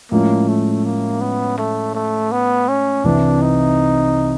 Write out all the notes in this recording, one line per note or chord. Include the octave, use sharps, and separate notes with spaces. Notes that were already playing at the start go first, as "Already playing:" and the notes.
A2 F3 G#3 A#3 C#4
A3
A#3
B3
A3
A3
B3
C#4
C2 C3 E3 D4
D#4